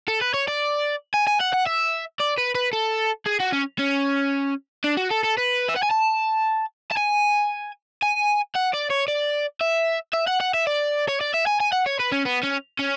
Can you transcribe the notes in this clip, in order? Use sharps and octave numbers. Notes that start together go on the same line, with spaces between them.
A4
B4
C#5
D5
G#5
G#5
F#5
F#5
E5
D5
B4
B4
A4
G#4
F#4
C#4
C#4
D4
F#4
A4
A4
B4
E5
F#5
G#5
A5
A5
G#5
G#5
F#5
D5
C#5
D5
E5
E5
F#5
F#5
E5
D5
C#5
D5
E5
G#5
G#5
F#5
C#5
B4
C#4
B3
C#4
C#4